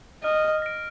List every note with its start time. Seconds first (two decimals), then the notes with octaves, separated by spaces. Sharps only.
0.24 D#5 F6
0.62 A#6 D7